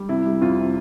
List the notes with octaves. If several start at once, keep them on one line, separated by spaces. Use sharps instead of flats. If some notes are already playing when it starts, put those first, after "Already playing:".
Already playing: G3
C3 E4
G3
F2 F4
C3